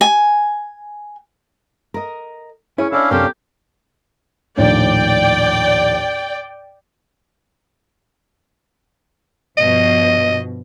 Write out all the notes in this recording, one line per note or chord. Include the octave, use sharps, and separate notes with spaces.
G#5
A#4 D#5
C#4 E4 G#4 C#5
C#4 D4 E4 A4 D5 D#5 F5
C2 F#2 C4 G4 A4 A#4
A#1 D#2 A2 D5 G5
G2 B2 F3 D#5